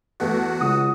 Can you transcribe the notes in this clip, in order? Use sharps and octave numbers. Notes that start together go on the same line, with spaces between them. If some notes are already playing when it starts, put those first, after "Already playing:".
E2 A3 F#4
C#2 D#6